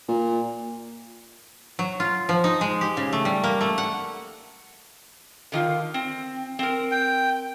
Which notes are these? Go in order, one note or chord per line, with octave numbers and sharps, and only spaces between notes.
A#2
F#3
F4
F3
D#4
G#3
G4
C#3
A3
G3
A#3
A3
F#5
D3 D#3 F4
C4
C4 A#4
G5